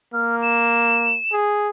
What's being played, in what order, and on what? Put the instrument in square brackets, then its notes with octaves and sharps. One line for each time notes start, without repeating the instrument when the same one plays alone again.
[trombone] A#3 [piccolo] F6
[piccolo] E7
[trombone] G#4